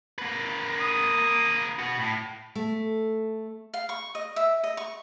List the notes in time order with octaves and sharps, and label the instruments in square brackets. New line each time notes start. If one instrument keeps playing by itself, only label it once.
[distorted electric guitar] A#3 B4
[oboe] D#6
[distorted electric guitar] F#4 B4
A2
[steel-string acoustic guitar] A3
[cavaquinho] F5
C#6
D#5
E5
D#5
C#6